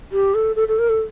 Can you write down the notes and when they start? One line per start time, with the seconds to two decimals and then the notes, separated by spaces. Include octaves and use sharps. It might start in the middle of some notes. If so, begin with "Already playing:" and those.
0.12 G4
0.34 A4
0.56 A4
0.68 A4
0.79 A#4
0.89 A4